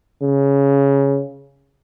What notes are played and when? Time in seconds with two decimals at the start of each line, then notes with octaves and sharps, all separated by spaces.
0.22 C#3